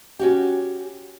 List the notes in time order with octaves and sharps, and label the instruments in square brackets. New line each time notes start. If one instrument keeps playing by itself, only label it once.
[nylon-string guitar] C#4 F#4 G4